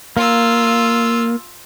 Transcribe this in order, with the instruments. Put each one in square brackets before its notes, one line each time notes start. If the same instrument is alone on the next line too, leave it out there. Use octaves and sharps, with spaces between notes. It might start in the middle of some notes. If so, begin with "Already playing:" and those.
[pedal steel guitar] A#3 [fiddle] F4 E6